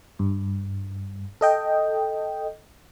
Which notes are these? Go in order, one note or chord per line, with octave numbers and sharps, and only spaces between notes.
G2
A4 D#5 G5